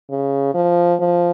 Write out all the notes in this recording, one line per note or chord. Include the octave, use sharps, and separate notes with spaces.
C#3
F3
F3